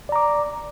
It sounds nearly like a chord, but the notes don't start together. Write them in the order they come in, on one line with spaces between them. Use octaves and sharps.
D5 A#5 D6